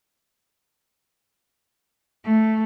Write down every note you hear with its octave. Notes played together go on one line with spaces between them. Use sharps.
A3